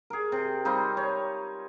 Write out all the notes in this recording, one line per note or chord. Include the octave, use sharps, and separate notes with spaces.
G#4 A#4
C3
G3 C4 D#4 F4
C#5